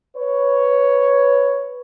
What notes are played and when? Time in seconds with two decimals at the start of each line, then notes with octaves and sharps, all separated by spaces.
0.16 B4 C#5